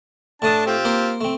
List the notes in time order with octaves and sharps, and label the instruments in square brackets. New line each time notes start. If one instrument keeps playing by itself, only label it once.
[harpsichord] A2 A3 D#6 [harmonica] D4 A5
[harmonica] C4 F4 G4
[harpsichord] A#3 C5
A3 C4